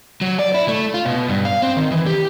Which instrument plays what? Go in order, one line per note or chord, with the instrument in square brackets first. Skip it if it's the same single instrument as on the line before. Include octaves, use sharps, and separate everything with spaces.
[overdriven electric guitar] F#3
D5
E4
A3
F4
B2
G2
F5
C4
D#3
E3
G4